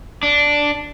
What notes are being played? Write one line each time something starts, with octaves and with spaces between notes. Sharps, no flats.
D4